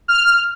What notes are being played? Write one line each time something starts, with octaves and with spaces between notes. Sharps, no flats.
F6